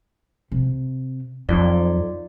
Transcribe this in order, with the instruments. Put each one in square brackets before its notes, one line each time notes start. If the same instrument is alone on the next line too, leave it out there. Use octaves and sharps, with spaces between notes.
[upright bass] C3
[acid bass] F2 [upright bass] F#3 [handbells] D#4 F4 D5